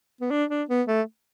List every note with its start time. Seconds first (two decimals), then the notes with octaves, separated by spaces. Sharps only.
0.21 B3
0.31 D4
0.49 D4
0.69 B3
0.88 A3